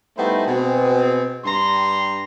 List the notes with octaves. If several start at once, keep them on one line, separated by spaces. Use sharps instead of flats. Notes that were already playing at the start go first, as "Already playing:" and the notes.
G3 A3 B3 D#4 E4 C5
B2 C4 G#4
G2 G3 A#5 C6